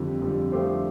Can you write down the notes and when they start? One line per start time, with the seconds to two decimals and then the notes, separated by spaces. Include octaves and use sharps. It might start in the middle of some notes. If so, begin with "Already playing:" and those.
Already playing: F2 D3 G3
0.21 F2 D3 G3
0.52 F3 A3 D4 G4 C5